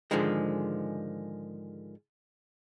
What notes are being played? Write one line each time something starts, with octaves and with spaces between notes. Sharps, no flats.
G#2 D3 D#3 F3 G#3